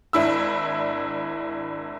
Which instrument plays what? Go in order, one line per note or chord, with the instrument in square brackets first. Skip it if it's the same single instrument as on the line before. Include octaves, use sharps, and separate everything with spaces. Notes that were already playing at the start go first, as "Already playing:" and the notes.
[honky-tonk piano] G#1 D4 E4 E6